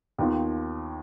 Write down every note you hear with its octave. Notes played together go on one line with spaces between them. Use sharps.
D#2 D#3 B3 F4